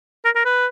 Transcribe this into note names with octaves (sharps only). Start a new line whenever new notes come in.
A#4
A#4
B4